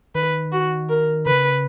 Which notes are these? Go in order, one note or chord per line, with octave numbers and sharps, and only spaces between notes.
D#3 B4
F#4
A#4
C#3 B4